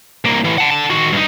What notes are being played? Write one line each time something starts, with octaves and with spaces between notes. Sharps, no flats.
C2 A#3
A2 E3
F#5 A5
D3 A5
D#3 F#4
G2 D#4